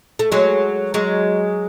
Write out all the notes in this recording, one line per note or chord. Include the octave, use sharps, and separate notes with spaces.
A3
F#3 G#3
F#3 G#3